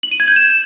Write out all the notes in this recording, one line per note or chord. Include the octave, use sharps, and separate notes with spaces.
F#7
D#7
G#6
G6
E7